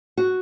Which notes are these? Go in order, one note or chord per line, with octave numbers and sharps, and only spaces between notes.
F#4